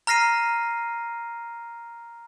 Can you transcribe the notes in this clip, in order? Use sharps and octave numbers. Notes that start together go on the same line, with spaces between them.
A#5 F6 A#6 C7 D#7